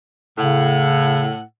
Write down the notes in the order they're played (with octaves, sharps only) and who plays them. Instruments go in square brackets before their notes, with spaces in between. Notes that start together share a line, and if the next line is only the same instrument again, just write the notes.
[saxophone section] A2 F#5 [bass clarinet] C#3